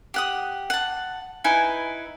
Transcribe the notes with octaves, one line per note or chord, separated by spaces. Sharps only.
G4 F#5 D#6
F#5 A5
D#4 E4 B4 G#5